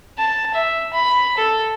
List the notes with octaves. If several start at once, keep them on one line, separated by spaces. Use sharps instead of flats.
A5
E5
B5
A4